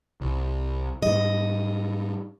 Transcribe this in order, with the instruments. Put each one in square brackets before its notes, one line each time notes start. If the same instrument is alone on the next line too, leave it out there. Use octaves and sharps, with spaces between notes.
[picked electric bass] C2
[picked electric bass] G#2 G3 [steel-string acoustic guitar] D#5